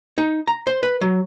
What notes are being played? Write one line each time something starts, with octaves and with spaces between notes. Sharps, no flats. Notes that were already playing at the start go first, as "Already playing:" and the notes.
D#4
A#5
C5
B4
F#3